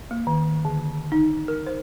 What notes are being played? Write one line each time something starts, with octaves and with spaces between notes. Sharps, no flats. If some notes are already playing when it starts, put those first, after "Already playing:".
A#3
D#3
D3
D#4
A#4
C5